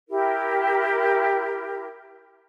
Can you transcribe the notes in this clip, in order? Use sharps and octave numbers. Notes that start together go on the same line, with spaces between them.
E4 G4 A#4